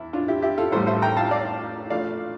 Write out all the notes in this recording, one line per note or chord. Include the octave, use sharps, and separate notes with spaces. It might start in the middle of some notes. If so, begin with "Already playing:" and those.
Already playing: E2 E4
D4 F4
E4 G4
E4 G4
F4 A4
A1 A2 G3 A4 C5
C5 E5
G5 A#5
F5 A5
D5 F5
A#1 A#2 A3 D5 F5